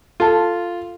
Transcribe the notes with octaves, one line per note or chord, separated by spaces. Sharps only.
F4 A4 A5